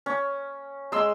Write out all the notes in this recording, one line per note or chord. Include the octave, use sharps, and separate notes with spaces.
C#4
G#3 C6 E6